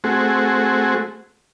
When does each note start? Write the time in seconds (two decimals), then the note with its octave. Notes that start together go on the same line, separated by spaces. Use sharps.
0.04 A3 C4 F#4 G#4